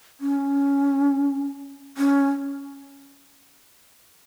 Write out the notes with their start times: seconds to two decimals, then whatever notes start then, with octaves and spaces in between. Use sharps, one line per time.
0.21 C#4
1.97 C#4